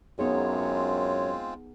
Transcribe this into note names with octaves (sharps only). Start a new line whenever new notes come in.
F#2 G#3 B3 C4 D#4 F4 G#4 C#5